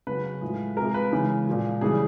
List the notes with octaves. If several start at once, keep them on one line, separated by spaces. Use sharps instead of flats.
C#3 F#3 B4
A2 F3 G#3
C3 F3 G#3 A#4
B4
C#3 E3 G#3
A#2 F3 G#3
C#3 E3 G3 G#4